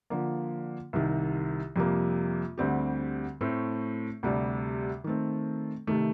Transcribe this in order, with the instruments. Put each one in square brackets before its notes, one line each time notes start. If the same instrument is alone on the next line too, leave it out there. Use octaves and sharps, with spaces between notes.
[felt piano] D3 F3 A#3
C2 C3 D#3
F2 C3 G3 A#3
D2 D3 G3 C4 G4
A2 A3 C4
D2 C3 G3 D4
D#3 A3 C4
C3 D#3 A3